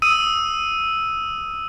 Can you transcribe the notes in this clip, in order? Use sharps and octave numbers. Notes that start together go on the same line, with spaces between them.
D#6 E6 D#7